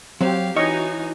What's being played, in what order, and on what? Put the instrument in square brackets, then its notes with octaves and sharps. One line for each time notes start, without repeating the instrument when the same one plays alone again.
[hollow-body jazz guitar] F#3 [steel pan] C4 [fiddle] G4 F5
[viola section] E3 D#4 F#4 [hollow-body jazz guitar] C#5 [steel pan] D#5 [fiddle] G#5